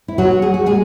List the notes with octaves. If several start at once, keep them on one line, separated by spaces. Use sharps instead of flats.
E4
B2 F#3 F#4
F#3 G#4
F#4
A#2 G#3 G#4